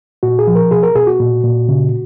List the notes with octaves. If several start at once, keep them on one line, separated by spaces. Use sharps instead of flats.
A#2 F#4
G#4
F3
A#4
B2 G#4
A#4
B2 G#4
F#4
A#2
A#2
C#3